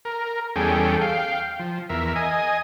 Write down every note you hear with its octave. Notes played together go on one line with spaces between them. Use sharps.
A#4
E2 G3 C#4 G#4 A4 G5
F5 G5
F3
E2 A#4 E5
D#5 G#5